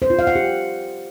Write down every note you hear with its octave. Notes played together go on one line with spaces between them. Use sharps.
C5
F4
F5
F#5
G4